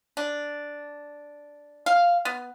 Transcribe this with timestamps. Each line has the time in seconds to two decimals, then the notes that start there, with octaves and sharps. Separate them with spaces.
0.17 D4
1.86 F5
2.25 B3